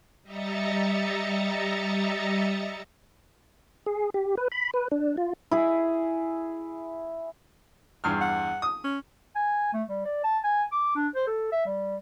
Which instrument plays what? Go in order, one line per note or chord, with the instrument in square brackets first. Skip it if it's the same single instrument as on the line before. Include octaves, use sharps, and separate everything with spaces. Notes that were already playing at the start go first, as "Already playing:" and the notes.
[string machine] G3 D#5 E5 A#5 A6 C#7
[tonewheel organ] G#4
G4
B4
B5
B4
D4
F4
[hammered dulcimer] E4 G#4
[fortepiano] E2 G2 F6
[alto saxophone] F#5
[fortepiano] D#6
[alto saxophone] C#4
[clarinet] G#5
A3
G3
D5
A5
G#5
D6
D4
C5
A4
E5
G3